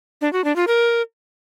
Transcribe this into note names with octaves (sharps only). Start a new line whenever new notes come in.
D4
F#4
D4
F4
A#4